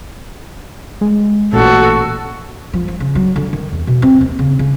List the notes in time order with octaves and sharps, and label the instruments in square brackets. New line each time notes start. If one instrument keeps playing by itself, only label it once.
[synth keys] G#3
[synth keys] A1 A#2 [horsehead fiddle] F#4 A4
[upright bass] F3
F3
C#3
F#3
D3
D#3
E2
B2
C4
D#2
C#3
C#3